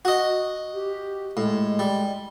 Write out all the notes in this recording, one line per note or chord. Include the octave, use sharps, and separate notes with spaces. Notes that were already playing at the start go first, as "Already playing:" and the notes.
F#4 D#5
G4
A2 G#3
G3